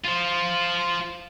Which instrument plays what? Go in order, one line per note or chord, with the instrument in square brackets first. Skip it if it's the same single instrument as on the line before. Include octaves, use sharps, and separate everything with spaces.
[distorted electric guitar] F4 C5